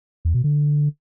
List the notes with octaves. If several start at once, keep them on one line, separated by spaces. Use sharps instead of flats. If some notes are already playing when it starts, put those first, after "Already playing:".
E2
B2
D3